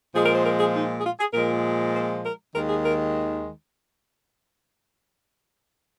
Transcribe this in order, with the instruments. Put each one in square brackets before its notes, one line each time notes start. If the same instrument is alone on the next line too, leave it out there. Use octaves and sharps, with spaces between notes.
[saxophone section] A#2 F3 G#3 G#4
A#4
C5
A#4
G#4
D#4
G#4
F4
G#4
A#2 F3 G#3 A#4
C5
A#4
D#2 D#3 G#3 A#4
G#4
A#4